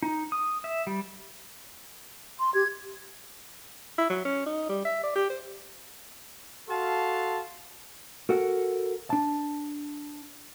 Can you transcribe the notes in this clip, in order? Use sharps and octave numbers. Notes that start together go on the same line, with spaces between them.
D#4
D#6
E5
G3
C6
G4 G#6
E4
F#3
C#4
D#4
G3
E5
D5
G4
C5
F#4 A4 F5 A5 C6
F#4 A4 A#4 F#5
D4 A5